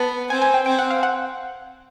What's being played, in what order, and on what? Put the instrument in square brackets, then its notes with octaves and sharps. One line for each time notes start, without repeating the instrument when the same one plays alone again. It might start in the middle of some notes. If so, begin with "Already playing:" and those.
Already playing: [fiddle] B3 [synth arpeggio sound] A5
[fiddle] C4 [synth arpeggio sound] G#5
[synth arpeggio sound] G#5
G5
[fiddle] C4 [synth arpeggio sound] G5
[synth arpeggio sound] F#5
F5
F#5